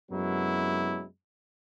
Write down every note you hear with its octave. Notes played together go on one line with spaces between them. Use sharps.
F#2 C3 F#3 G#3 B3 E4